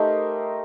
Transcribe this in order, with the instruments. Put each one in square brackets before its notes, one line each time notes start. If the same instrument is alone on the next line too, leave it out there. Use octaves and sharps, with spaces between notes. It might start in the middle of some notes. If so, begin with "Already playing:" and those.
Already playing: [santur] A3 D#4 G4 A#4 C5 D#5